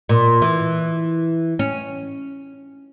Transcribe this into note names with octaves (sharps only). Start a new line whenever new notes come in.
A#2
E3
C#4